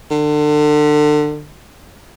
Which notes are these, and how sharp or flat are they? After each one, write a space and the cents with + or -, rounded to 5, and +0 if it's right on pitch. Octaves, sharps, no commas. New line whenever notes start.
D3 +30